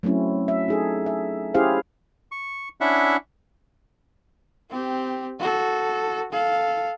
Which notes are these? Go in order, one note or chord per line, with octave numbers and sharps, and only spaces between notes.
F#3 A3 C4 C#4 E4
E5
D#4 G#4 A4
E5
C#4 E4 G4 G#4 C5 F5
C#6
C#4 D4 E4 E5 F#5
C4 G4
F#4 A4
A4 F5